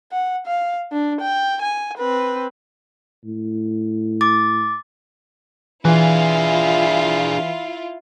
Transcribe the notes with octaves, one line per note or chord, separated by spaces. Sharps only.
F#5
F5
D4
G5
G#5
C4 B4
A2
D6 A6
E3 D4 E4 F4 G#4